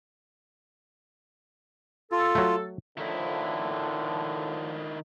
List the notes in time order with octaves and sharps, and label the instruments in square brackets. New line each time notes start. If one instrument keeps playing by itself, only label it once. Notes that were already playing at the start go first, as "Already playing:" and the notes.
[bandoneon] F4 [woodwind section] A4
[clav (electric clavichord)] F#3 A3
[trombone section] A2 D3 F3 [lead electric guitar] D#3 E4